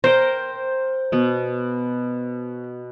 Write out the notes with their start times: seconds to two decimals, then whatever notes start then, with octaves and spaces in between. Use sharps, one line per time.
0.04 A#4 C5 G5
1.12 B2 B3